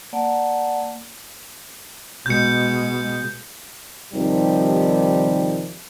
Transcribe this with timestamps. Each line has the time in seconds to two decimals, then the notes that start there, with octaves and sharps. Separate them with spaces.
0.13 A#3 D5 F#5 A5
2.26 B2 G#3 G6 C#7
4.14 D#2 C3 D#3 F3 G3